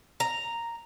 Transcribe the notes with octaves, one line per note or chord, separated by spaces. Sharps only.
A#5